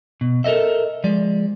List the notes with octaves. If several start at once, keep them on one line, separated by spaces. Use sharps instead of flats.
B2
A4 A#4 C5 D#5 E5
F3 G#3 D5